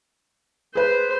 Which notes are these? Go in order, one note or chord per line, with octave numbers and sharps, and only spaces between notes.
G#4 B4 C5